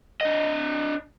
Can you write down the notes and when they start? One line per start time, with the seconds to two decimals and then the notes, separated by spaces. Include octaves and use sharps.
0.21 D4 D#5